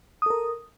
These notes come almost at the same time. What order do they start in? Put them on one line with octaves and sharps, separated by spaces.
D#6 A4 A#4